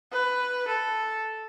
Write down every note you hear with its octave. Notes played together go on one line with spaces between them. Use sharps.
B4
A4